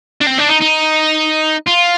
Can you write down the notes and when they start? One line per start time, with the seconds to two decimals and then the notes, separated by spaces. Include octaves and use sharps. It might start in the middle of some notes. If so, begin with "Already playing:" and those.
0.21 D4
0.27 C4
0.39 D4
0.49 D#4
0.62 D#4
1.68 F4